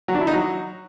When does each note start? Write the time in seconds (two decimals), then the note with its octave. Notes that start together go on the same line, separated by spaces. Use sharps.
0.08 F#3
0.15 D4
0.21 E4
0.27 D#4
0.33 F#3